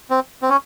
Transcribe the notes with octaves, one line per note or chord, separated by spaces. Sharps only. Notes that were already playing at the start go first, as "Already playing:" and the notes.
C4
C4
C#4